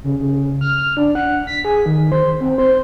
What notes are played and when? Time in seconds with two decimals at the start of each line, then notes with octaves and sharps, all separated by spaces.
0.04 C#3
0.20 C#3
0.61 F6
0.97 D4
1.15 F#5
1.47 B6
1.65 G#4
1.86 D#3
2.12 C5
2.41 C4
2.58 C5